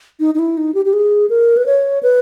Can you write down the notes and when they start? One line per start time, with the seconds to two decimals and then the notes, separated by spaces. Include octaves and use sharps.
0.20 D#4
0.35 D#4
0.39 E4
0.57 D#4
0.74 G4
0.85 G4
0.93 G#4
1.30 A#4
1.57 B4
1.66 C#5
2.03 B4